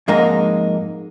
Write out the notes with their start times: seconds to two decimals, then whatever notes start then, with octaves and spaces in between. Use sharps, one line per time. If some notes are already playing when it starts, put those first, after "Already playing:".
0.08 F2 G#2 G#3 A#3 D#4 A#4